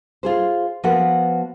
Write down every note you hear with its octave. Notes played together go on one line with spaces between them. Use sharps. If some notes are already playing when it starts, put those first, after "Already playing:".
F4 G#4 C5
F3 B3 F#4 A#4 B4 F#5